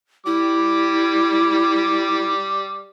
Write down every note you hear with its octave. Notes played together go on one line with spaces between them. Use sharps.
G3 E4 D6